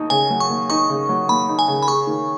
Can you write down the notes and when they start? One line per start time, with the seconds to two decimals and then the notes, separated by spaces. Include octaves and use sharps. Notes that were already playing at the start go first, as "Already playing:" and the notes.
Already playing: D#2 D#4
0.10 C#3 G#5
0.30 F#3
0.40 C#6
0.50 D#2
0.70 D#4 C#6
0.89 C#3
1.09 F#3
1.29 D#2 B5
1.49 D#4
1.59 G#5
1.68 C#3
1.83 B5
1.88 G#4 C#6
2.07 D#3